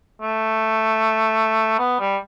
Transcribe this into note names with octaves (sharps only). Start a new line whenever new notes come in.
A3
B3
G3